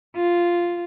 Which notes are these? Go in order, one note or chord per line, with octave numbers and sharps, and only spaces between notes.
F4